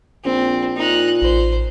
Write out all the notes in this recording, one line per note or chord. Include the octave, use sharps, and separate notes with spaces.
A#1 C4
A#2 D#4 F#6
A1 C5